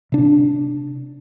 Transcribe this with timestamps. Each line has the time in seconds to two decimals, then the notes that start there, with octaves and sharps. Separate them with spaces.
0.12 C3 D4